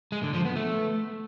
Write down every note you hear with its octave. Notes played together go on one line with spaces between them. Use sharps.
G#3
D3
F3
B3
A3